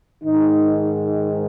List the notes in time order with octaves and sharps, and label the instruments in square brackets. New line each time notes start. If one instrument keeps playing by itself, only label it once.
[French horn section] G#2 D#3 D#4